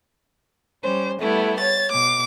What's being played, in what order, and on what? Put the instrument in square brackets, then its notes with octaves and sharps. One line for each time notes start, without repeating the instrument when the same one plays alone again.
[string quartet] G3 C#4 C5
[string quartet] G3 B3 E4 [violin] A3
[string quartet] C#5 [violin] A6
[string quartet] B2 [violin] D6